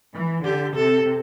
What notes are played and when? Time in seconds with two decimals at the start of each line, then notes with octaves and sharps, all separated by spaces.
0.14 E3
0.44 D3 G4
0.75 C3 A4